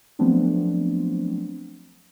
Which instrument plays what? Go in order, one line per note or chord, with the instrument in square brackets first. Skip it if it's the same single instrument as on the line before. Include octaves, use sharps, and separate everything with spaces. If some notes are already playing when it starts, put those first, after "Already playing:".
[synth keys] F3 F#3 A3 B3 C4 D4